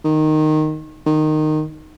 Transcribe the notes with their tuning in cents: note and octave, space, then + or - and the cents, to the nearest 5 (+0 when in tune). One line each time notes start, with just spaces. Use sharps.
D#3 -10
D#3 -15